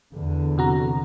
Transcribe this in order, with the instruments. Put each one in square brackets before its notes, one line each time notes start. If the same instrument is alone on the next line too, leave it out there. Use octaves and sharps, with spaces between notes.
[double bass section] E2 D3
[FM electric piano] C3 F#4 A#5